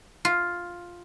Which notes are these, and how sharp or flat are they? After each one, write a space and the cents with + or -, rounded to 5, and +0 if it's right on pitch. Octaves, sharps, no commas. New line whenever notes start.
F4 +5